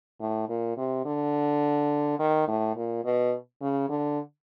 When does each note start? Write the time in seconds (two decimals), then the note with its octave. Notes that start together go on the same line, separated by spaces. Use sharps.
0.21 A2
0.49 A#2
0.77 C3
1.05 D3
2.19 D#3
2.48 A2
2.76 A#2
3.04 B2
3.61 C#3
3.89 D3